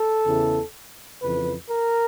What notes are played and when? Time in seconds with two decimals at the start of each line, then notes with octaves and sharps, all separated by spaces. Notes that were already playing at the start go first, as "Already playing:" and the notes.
Already playing: A4
0.26 E2 C#3 E3
1.21 F2 C#3 E3 B4
1.70 A#4